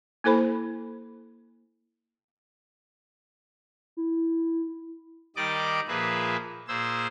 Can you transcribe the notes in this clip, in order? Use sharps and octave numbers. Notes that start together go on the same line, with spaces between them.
A#3 E4 A4 C5 B5
E4
D#3 G3 D5 D#5 D6
A#2 F3 G#4 B4 E5
A#2 G#4 C5 E6